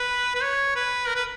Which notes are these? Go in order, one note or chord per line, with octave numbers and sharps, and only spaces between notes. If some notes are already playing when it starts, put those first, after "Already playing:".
Already playing: B4
B4
C#5
B4
A#4
B4